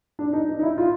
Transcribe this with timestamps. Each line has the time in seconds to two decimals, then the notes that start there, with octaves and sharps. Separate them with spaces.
0.19 D4
0.33 D#4
0.49 D#4
0.59 D#4
0.63 E4
0.78 F4